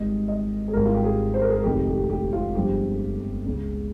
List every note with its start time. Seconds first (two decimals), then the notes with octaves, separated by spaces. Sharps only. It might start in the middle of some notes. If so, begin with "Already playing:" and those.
Already playing: G#1 G#2 G3 D#5
0.28 D#5
0.68 G#4
0.73 G#1 G#2 G3 A#4
0.85 F4
0.94 G4
1.04 G#4
1.34 C5
1.41 A#4
1.49 G#4
1.56 A#4
1.64 F1 F2 C3 D#3 G4
1.87 G4
2.09 G4
2.33 F4
2.54 G1 G2 F3 G#3 G4
3.45 C#2 C#3 G#3